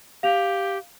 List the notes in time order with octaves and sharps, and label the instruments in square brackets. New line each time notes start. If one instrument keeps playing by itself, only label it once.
[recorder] G4 [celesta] F5 F7